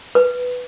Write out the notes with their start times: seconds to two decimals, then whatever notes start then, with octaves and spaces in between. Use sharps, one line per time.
0.15 B4